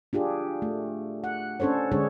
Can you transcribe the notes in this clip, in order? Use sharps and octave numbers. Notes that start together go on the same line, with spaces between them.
D4 F4 G4 G#4
A3
F#5
C#4 D4 A4 C5 C#5
D3 G#3 C#4 D4 G#4 C#5